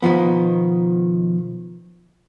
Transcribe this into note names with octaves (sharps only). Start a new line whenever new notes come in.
B2 D#3 F3 B3